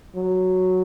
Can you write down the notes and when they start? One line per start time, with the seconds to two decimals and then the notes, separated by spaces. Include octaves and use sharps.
0.15 F#3